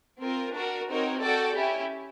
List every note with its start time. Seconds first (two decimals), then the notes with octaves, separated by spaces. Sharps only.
0.21 C4 F4 A#4
0.55 D4 F#4 A#4
0.88 C4 D#4 F#4 A#4 C#5
1.22 F#4 A4 D5 G5
1.55 C#4 E4 G4